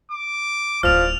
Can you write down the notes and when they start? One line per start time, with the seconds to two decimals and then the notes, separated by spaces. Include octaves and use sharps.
0.12 D6
0.83 D1 F3 E4 D5 F6 F7